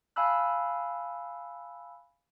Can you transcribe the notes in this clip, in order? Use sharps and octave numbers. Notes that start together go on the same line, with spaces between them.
F5 G#5 A5 B5 E6 F#6